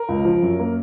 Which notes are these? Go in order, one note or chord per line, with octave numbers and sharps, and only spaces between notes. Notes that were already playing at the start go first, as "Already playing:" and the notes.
Already playing: A#4
C#2
F3
F#2
A#3